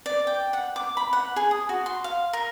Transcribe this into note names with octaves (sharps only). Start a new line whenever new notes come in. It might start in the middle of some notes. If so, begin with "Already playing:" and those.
D5
G5
F#5
D6
B5
F#5
G#4
D#6
F#4
C6
F5
A#4